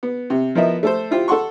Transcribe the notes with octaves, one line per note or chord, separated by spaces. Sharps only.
B3
C3
F3 B3 E4 A#4 D#5 E5
A3 A4 C5
E4 F4 G4 C5
A4 F#5 C6 C#6